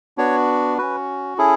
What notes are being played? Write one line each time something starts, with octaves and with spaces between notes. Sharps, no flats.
B3 D4 F#4 C#5
C#4 F#4 B4
C#4 E4 G#4 A4